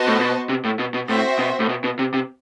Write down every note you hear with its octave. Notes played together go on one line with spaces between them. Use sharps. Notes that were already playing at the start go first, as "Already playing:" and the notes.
Already playing: B3 F#4 C5 D#5 A5
A2
B2
C3
A2
B2
B2
A2 C4 F#4 C5 E5
B2
A2
B2
B2
C3
C3